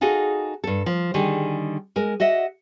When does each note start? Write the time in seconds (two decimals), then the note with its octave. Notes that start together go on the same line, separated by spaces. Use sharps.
0.01 D#4 F#4 G#4 A4 F5
0.64 G2 A4
0.86 F3
1.14 D3 D#3 G3 G#4
1.96 G#3 A#4
2.20 F#4 D#5 E5 F#5